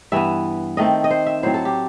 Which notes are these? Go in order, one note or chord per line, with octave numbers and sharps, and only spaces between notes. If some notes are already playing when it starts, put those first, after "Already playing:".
G2 E3 B3 E5
D#3 A3 C4 D#5
D#5
C5
E5
A2 F#3 C4 C5
A4
G4